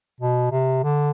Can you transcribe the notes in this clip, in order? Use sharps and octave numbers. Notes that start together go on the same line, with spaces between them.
B2
C3
D3